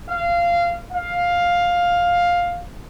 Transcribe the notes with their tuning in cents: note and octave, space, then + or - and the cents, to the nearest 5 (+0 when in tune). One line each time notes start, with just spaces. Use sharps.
F5 -15
F5 +10